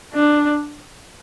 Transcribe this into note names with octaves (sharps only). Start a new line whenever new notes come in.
D4